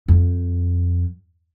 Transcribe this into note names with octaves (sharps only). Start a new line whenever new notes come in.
F2